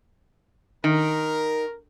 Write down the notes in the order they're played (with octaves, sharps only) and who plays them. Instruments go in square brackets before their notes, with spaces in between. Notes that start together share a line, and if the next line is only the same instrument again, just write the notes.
[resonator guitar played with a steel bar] D#3 [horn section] A#4